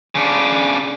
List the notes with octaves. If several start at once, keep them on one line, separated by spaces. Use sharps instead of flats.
C#3 D4